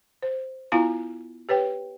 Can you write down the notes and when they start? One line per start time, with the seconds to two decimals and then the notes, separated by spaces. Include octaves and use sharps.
0.22 C5
0.72 B3 E4 F4 F5 G#5 A#5
1.49 G4 B4 C#5 G5